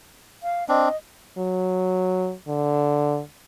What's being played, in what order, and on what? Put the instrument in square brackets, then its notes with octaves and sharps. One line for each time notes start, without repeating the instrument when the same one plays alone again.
[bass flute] F5
[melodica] C4 D4 [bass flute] D#5
[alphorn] F#3
D3